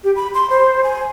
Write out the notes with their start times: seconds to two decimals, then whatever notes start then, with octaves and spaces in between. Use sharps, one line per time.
0.04 G4
0.16 B5
0.34 C6
0.50 C5
0.84 G#5